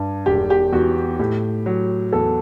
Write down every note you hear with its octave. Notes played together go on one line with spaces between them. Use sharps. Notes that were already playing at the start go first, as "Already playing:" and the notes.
Already playing: G2
E1 G4
G4
E2 F#4
A2 G4
F#3
E2 A4